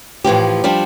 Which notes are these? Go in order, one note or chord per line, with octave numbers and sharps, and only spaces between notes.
A2 E3 F3 G4
F3 G3 D4